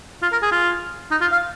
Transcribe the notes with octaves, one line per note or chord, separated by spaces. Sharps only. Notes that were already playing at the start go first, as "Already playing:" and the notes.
F4
A#4
G#4
F4
D#4
F4
F5